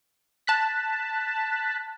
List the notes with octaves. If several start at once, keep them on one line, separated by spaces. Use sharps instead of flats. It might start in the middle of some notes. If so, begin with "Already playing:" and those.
A5 F#6 B6